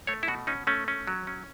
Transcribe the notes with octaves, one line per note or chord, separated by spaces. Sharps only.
A3 C#5
E4
B2 F#4
C#4 D#4
A3 C#4
C#4
F#3
C#4